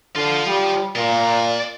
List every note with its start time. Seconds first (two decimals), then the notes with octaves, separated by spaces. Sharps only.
0.16 D3 F4 C5
0.47 G3
0.96 A#2 D5 A#5